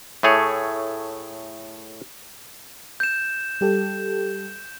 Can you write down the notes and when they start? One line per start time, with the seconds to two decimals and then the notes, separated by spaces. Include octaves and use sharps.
0.23 A2 A3 G#4 C#5
3.00 G6 E7
3.61 G3 G4 A4